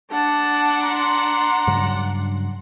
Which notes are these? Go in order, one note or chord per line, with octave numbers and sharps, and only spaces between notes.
D4 F#5 A5
A#5 C6
G2 C#3 F#3